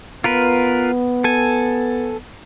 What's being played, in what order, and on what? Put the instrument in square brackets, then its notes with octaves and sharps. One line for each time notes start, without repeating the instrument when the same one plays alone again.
[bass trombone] B3 [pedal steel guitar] F4 A#4 B4
[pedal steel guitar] A4 G#5